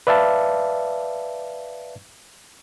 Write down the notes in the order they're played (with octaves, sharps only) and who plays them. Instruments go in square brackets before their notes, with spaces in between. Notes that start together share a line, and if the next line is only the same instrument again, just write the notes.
[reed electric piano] B4 D5 E5 F5 A5